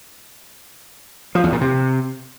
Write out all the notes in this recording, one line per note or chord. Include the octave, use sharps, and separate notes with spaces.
F3
E2
A#2
C3